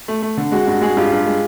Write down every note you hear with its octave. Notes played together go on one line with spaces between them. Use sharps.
A3
A3
D3
G#3 F#4
G2 F#4
G#3 F#4 G#4
G2 F4 G4
G2
G#3